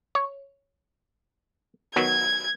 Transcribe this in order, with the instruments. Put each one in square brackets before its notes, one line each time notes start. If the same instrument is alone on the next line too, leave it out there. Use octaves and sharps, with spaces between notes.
[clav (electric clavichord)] C#5
[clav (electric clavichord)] D#3 F#3 B3 [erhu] G#6